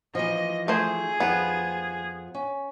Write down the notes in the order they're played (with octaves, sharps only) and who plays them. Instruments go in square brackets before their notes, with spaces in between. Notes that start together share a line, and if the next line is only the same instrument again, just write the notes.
[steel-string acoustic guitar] E3 F3 [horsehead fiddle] D#5
[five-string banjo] A3 C5 [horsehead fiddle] G#4
[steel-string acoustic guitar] F2 F3 A#5 [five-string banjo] B3
[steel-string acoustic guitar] C#4